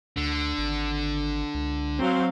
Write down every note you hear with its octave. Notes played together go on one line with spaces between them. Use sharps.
D2 D3
G#1
C#2
F#3 C4 F5